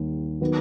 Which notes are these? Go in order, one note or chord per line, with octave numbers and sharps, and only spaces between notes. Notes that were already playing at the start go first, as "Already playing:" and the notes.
Already playing: D#2 D#3 G3
D#3 F#3 B3